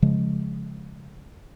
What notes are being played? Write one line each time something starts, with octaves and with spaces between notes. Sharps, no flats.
C#3 F3 G#3